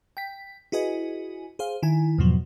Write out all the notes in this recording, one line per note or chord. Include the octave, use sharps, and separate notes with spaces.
G5 B6
E4 F#4 G#4 B4 D#5 G#5
G#4 C5 F5
D#3 E4 G#5
E2 G#2 B2 F3 F#3